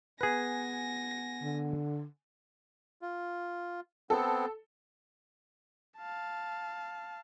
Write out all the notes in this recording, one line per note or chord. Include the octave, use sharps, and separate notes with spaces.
B3 G#4 B4 F#5 G#5 A#6
D3
F4
B3 C4 A4
F5 A5